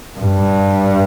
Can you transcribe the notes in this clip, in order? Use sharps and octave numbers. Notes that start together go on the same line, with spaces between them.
G2